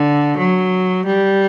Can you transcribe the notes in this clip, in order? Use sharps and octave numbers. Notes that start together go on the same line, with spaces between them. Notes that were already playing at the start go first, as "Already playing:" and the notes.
Already playing: D3
F#3
G3